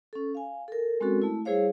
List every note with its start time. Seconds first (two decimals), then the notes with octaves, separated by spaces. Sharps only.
0.13 C#4 A4
0.35 F5 G#5
0.68 A4 A#4
1.01 G#3 C4 C#4 F#4 A4 A#4
1.22 A3 E4
1.45 G3 E4 G#4 C5 C#5 F5